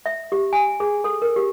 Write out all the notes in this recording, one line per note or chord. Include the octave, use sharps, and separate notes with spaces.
E5
G4
G#5
G#4
A4
A#4
G4